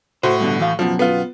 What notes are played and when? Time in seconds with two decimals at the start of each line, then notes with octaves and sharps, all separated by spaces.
0.23 A2 F#4 C5
0.40 G2 B2 D3
0.60 E3 F5
0.79 F#2 B2 F3
0.99 B3 F4